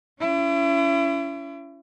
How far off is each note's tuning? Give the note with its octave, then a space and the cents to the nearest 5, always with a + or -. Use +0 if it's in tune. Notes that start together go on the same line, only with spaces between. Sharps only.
C#4 +30 E4 +35